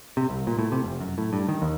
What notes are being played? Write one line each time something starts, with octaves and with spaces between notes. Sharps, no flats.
C3
C2
A#2
A2
C3
F1
F#2
A2
G2
D#3
D#2